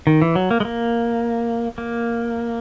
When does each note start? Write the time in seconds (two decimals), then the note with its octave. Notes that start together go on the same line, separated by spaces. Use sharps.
0.07 D#3
0.22 E3
0.35 F#3
0.51 A#3
0.60 G#3
0.65 A#3
1.78 A#3